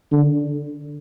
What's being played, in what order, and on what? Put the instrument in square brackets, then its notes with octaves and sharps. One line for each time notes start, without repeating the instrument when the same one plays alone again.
[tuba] D3